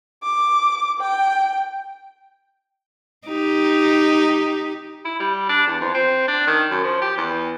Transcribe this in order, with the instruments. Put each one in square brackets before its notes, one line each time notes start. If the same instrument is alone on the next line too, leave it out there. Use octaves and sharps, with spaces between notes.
[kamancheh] D6
G5
[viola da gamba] D#4 G4
[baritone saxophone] E4
G3
D4
E2
F2
C4
D4
D#3
F#2
F3
G4
E2